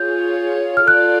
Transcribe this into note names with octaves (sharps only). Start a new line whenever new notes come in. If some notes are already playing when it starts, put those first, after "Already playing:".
Already playing: F4 G#4 C#5 G6
F6
F4 A4 D5 F#6